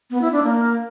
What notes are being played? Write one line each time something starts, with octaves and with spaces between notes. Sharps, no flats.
B3
E4
D4
A#3